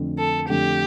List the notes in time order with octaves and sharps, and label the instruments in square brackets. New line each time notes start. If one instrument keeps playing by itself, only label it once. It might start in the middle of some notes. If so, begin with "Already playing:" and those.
Already playing: [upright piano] F2 D3 A3
[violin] A4
[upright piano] F2 D3 A3 [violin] G4